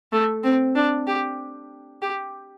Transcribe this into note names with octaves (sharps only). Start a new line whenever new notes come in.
A3
C4
D4
G4
G4